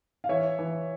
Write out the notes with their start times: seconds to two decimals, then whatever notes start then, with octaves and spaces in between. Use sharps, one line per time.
0.24 F5
0.29 E3 C#5 E5
0.59 E3